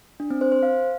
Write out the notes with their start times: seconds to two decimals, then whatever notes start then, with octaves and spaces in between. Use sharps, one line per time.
0.20 D4
0.30 C4
0.41 C5
0.52 C5
0.63 F5